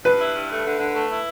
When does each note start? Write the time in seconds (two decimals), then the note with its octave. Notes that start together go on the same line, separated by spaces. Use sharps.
0.04 G2 B4
0.20 E4
0.35 G2
0.49 A3
0.65 D3
0.79 D3
0.94 A3
1.09 E4